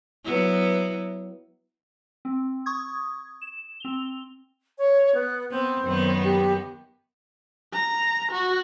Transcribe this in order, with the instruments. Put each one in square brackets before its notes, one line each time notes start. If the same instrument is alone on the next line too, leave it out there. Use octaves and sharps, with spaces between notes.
[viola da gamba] F#3 B3 E4
[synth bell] C4
C#6 D#6 G#6
E7
C4 F7 G7
[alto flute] C#5
B3
[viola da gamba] B3 [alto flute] C4
[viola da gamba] F#2 D#3 B3
[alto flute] G4
[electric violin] A#5
F#4